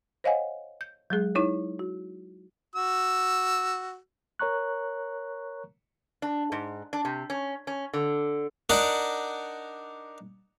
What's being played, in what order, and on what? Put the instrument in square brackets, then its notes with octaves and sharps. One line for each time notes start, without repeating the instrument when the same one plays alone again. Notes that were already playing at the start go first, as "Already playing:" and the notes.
[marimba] C5 C#5 D#5 F5 F#5 G#5
G6
F#3 G#3 G#4
D#4 E4 C#5
F#4
[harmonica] F#4 E6
[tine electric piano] A#4 C#5 A#5 C#6 F#6
[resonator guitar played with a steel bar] D4
G#2
D4
C3
C#4
C#4
D3
[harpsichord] D4 D#4 A#4 D5 F#5